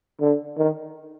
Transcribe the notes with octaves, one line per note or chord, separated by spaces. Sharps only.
D3
D#3